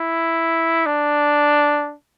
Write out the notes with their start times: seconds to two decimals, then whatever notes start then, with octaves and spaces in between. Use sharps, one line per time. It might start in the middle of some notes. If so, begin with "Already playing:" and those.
Already playing: E4
0.86 D4